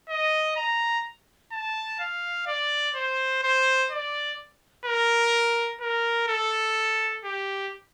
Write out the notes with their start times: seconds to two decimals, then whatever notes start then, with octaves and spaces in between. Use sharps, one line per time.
0.09 D#5
0.57 A#5
1.52 A5
2.00 F5
2.47 D5
2.96 C5
3.43 C5
3.91 D5
4.86 A#4
5.81 A#4
6.28 A4
7.25 G4